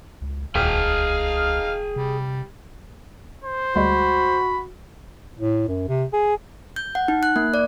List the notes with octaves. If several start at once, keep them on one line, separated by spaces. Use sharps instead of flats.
C#2
D#1 C#2 D#4 G#4 F5 G5 F6
C3 G3
C5
D2 G3 G#3 F#4 B5
A2
F#2
C3
G#4
G6
F#5
D#4
F#6
A#3
D5